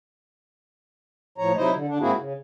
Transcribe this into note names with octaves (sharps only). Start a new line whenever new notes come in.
A2 F3 C#5 A#5
C3 F#3 D#4 E4 C5 D#5
D3
D3 D4
G#2 A#3 C4 E4 F#4 G#4
C#3